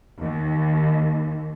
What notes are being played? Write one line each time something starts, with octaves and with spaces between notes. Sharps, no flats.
D#2